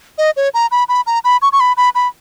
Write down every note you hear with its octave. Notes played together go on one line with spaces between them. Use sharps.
D#5
C#5
A#5
B5
B5
A#5
B5
C#6
C#6
B5
B5
B5